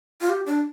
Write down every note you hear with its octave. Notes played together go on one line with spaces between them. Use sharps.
F4
G4
D4